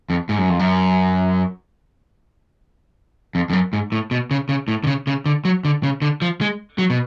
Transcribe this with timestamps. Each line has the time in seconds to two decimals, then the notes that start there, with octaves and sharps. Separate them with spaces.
0.10 F2
0.29 G#2
0.38 F#2
0.49 F2
0.59 F#2
3.35 F2
3.50 F2
3.53 F#2
3.73 G#2
3.92 A2
4.11 B2
4.31 C#3
4.49 C#3
4.68 A2
4.84 D3
4.87 C#3
5.07 C#3
5.26 D3
5.45 F#3
5.65 D3
5.83 C#3
6.02 D3
6.22 F3
6.41 G#3
6.78 F#3
6.90 B2